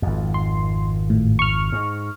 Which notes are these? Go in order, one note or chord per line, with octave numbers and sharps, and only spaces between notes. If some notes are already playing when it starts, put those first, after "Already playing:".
G#1 F2
C6
A2
C#6 F6
G#2